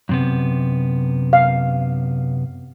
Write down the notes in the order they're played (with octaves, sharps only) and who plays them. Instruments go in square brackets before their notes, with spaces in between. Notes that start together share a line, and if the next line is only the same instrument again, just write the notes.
[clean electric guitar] F#2 C3 B3
[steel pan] F5